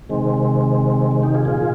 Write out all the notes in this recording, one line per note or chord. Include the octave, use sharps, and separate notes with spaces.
C3 D#3 G#3 C4
G#3
D#4 G4
F4 G#4
A#2 F3 F4 G#4